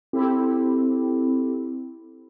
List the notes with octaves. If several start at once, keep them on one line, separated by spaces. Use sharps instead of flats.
C4 E4 G4 A4